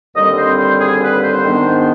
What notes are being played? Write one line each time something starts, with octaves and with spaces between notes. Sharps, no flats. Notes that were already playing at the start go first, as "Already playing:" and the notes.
D#2 D3 G3 C4 D#5
C5
C5
G#4
B4
C5
G#2 D#3 B3 D4